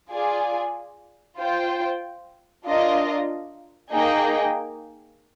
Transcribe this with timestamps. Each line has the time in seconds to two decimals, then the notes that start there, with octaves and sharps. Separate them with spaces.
0.11 F4 G#4 D5 G#5
1.38 F4 C5 G5
2.66 D4 F4 A#4 D#5
3.93 A#3 D#4 G#4 D#5 G5